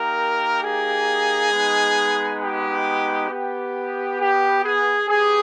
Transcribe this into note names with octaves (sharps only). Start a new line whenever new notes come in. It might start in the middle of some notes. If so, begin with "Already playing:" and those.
Already playing: A#3 D#4 G4 A#4
G#4
G#3 B3 D#4
G4
B3 G4
G4
G#4
B3 G4 G#4